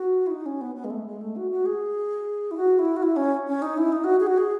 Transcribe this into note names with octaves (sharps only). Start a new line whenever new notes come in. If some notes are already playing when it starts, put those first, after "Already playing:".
Already playing: F#4
E4
D#4
C#4
B3
B3
G#3
A3
G#3
A3
F#4
F#4
G#4
E4
F#4
E4
F#4
E4
C#4
C#4
D#4
E4
D#4
F#4
G#4
F#4
G#4